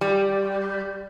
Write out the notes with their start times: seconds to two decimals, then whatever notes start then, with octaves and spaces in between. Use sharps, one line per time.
0.01 G3